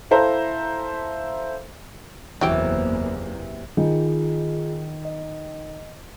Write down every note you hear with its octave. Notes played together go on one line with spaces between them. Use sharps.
E4 A4 C5 E5 F5 A#5
F#1 E2 C3 E3 F#3 A#3 G4 G5
D#3 F4 G#4
D#5